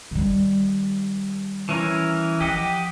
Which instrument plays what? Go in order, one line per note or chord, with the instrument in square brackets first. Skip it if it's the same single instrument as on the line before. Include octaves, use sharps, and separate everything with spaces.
[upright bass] D#3 G3
[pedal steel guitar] E3 C#4 A#4
[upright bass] F3 [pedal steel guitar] G4 D#5 F#5